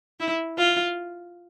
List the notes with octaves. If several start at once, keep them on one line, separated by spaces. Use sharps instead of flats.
E4
F4